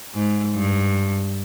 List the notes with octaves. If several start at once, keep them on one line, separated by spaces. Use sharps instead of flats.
G#2
G2